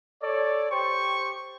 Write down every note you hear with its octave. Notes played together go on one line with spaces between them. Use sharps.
A4 C#5 D5
G4 C5 G5 C#6